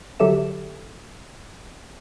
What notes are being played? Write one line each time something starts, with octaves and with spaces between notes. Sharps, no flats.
D3 F#3 G4 A4 E5 E7